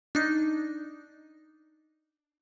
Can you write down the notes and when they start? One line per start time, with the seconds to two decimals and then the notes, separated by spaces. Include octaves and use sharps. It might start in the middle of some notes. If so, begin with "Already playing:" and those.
0.15 D4 D#4